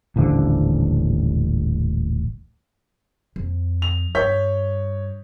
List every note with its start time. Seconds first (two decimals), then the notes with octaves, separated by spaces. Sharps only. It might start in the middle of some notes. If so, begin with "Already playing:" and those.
0.16 D#1 A1 D3 F3
3.36 F2
3.82 F7
4.15 G2 C#5 G6 B6